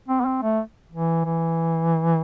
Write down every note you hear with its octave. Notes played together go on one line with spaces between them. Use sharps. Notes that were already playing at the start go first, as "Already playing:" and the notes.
C4
B3
C4
A3
E3
E3